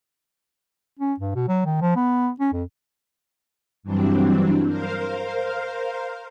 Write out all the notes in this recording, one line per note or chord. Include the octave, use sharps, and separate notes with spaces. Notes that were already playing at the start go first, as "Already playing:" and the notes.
C#4
G2
B2
F#3
D#3
F3
B3
C#4
F2
G2 E3 F#3 G3 C4 D4
A#4 C5 F5